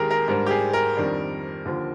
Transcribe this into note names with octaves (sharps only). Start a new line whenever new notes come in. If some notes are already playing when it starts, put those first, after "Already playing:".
Already playing: D#2 D#3 G#3 G4 G#4 A#4
A#4
G#2 G3 D4 A#4
G4
G#4
A#4
F2 D#3 G3 D4
D#2 D3 F3